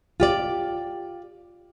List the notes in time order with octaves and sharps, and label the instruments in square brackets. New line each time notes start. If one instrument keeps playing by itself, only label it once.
[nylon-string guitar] F4 G4 D5